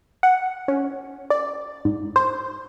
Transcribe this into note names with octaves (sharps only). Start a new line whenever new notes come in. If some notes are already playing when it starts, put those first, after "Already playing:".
F#5
C#4
D5
G#2
C5